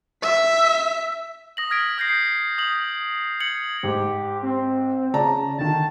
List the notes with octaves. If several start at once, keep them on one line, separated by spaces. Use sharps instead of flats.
E5 B6
D#6 A#6 F#7
D#6 F6 G#6 B6 D7
D#6 G6 A#6 C7
D#6 F#7
G#6 C#7 F#7
G#2 G4
C4
C#3 D5 A5 A#5
D3 D#3 A5